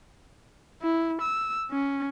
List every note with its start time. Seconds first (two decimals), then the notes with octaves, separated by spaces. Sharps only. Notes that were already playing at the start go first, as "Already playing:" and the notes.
0.82 E4
1.21 E6
1.71 C#4